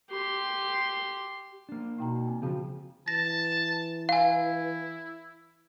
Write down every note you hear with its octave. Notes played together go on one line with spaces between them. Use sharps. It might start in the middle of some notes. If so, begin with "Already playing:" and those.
G4 C6
A#3 D4
B2 D#4 G5 A#5
C4 G#5
C#3 F3 G3 C4 F#4 A5
E3 A5 A#6
E4 F5 G#5